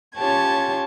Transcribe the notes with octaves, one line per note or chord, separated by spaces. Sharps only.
C#4 F4 G4 C#5 A5 G#6